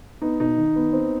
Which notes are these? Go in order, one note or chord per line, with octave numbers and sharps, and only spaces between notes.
B3 D#4
B2 D#4
D#3
B3
C4